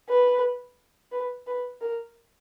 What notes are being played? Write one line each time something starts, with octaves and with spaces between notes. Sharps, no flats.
B4
B4
B4
A#4